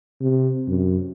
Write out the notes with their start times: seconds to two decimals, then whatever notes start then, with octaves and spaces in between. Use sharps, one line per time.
0.21 C3
0.68 F#2